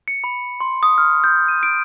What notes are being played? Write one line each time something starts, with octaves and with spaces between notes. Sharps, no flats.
C#7
B5
C6
D#6
F6
G6
D#7
D7